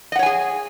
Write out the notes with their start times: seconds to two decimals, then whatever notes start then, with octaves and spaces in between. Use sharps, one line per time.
0.12 D#5
0.16 F#5
0.19 C#5
0.23 G#5
0.26 G#4